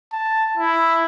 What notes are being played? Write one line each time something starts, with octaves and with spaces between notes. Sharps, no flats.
A5
E4